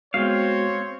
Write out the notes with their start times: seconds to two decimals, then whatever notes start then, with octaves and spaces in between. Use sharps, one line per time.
0.14 G#3 B3 C4 F#4 C#5 F5